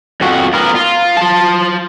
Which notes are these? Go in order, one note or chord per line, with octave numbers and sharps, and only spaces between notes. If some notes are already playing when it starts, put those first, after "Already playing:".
F2 F#4
B3 A#4
F4
F4 A5